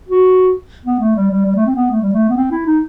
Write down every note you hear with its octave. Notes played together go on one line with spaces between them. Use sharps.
F#4
B3
A3
G3
G3
G3
A3
C4
B3
A3
G3
A3
B3
C4
E4
D#4